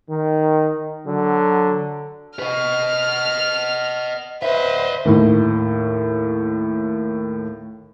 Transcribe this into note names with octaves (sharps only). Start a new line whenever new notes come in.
D#3
D3 F#3
B4 D#5 F6
B4 C5 D#5 E5
D#2 A2